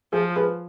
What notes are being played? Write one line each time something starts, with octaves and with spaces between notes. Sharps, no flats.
F3 F4 G#4
G#4 B4